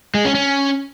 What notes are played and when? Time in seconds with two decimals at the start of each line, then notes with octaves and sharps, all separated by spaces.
0.14 G#3
0.25 C#4
0.35 C#4